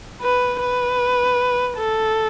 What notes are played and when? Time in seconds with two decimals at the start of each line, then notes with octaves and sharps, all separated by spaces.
0.22 B4
0.61 B4
1.77 A4